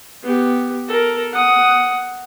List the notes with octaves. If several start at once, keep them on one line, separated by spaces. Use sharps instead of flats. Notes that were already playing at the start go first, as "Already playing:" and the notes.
B3 G4
A4 A#4
F#5 D#6